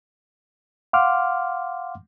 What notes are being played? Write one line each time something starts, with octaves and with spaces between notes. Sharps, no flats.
F5 F#5 C6 D6 F6